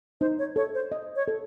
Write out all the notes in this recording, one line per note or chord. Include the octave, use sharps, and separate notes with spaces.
D#4 C5
C#5
A4 C#5
C5
D#5
C#5
A4